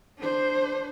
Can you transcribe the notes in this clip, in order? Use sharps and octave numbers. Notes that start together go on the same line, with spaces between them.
D4 C5